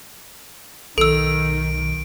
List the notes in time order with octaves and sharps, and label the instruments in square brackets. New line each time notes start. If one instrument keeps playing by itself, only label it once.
[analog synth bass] B1 [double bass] D#3 [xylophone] A4 E6 [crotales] D7